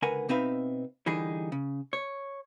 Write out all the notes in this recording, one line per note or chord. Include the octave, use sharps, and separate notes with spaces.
C#2 D3 A#4 B4 F#5 G#5
B2 C4 D#4 B4 E5 F5
D3 E3 G3 D#4 G#4
C#3
C#5